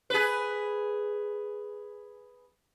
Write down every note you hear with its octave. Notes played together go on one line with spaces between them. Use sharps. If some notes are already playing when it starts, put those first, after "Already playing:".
G#4 B4